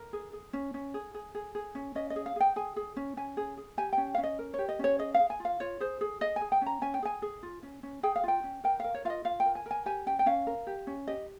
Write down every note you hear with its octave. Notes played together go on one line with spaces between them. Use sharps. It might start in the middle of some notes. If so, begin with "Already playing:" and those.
Already playing: A#4
G#4
G#4
C#4
C#4
G#4
G#4
G#4
G#4
C#4
C#4 D#5
D#5
G#4
F5
G#4 G5
G#4 G#5
G#4
C#4
C#4 G#5
G#4
G#4
G4 G#5
C#4 G5
C#4 F5
D#5
A#4
G4 C#5
D#5
C#4 C#5
G#4 D#5
F5
G#4
G#5
F4
F5
F4 C#5
G#4 C5
G#4
G#4 D#5
G#4 G#5
G5
C#4 A#5
C#4 G#5
G5
G#4 G#5
G#4
F4
C#4
C#4
G#4 G5
F5
F4 G5
C#4
A#4 G5
A#4 F5
C#5
F4 D#5 F5
F4 F5
G5
A#4
G#5
A#4 G#5
G4 G#5
C#4 G5
G5
C#4 F5
A#4
G4
C#4
G4 D#5